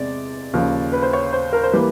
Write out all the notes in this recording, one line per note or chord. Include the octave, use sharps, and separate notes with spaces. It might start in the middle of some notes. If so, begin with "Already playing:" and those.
Already playing: E2 C3 G#3 D5
D#2 C#3 F3
B4
C5
C#5
C5
A#4
C5
E3 G3 A#3 B4